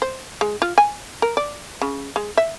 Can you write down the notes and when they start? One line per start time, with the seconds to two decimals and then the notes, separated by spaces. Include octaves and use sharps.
0.02 C5
0.41 G#3
0.62 F4
0.78 G#5
1.22 A#4
1.37 D5
1.82 C#3
2.16 G#3
2.37 E5